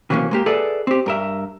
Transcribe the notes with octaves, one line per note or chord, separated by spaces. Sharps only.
C3 E3 F#3 A#3 C#4
G#3 A#3 G4
G#4 A4 B4 D5 E5 F#5
C4 G4
G2 A#4 E5